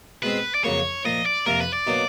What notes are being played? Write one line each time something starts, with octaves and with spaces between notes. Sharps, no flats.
B2 G#3 C4 B4
D5
F2 C#3 F#3 A#3 C#5
A#2 F3 A#3 D#5
D5
F2 C3 F3 A#3 A#4
B4
D5
B2 F#3 A#3 D#4